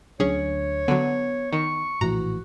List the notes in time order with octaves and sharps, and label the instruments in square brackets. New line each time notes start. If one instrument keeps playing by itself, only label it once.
[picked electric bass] D2 F#3 D4 [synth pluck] C#4 G#4 [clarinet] C#5
[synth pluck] D3 F#3 [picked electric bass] B3
[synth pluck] D#3 [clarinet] C#6
[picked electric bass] A#1 A2 E3 [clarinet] F#4 [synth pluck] A#5